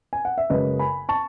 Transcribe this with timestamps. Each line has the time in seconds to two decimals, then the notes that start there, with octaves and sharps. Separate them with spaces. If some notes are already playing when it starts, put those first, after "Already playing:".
0.13 G#5
0.25 F#5
0.38 E5
0.50 F#1 F#2 C#3 G#3 B4 D#5
0.79 G#5 B5
1.09 A5 C#6